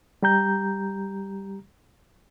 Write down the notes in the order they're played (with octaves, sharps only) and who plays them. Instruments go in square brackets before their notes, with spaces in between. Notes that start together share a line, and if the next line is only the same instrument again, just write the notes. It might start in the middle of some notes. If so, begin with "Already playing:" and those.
[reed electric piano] G3 G4 A#5 G6